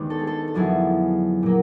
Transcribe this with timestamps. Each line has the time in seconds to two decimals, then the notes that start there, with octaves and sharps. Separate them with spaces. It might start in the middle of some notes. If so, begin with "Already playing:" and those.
Already playing: D#2 D#3 G#3 B3 D4
0.10 A4
0.19 G#4
0.27 A4
0.48 A4
0.54 F2 D3 F#3 B3 E4 G#4
1.43 A#2 F#3 A#3